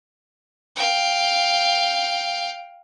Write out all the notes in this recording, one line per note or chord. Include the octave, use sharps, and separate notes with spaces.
F5 G5